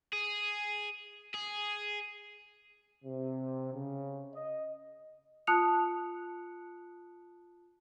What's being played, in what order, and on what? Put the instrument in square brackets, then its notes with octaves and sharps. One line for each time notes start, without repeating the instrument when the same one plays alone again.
[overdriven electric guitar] G#4
G#4
[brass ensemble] C3
C#3
D#5
[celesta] F4 A5 D#6 F#6 C#7 F7